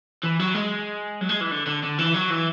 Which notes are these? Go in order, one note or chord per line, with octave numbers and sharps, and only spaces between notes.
E3
F#3
G#3
F#3
G#3
E3
D3
D3
D3
E3
F#3
E3